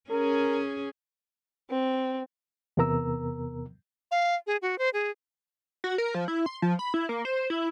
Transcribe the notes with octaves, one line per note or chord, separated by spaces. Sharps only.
C#4 G#4 A#4
C4
E2 C3 B3 A#4 A#5 E6
F5
G#4
F#4
C5
G#4
F#4
A#4
F3
E4
C6
F3
B5
E4
A#3
C5
E4